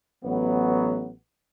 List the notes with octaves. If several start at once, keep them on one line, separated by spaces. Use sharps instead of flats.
A1 F#3 B3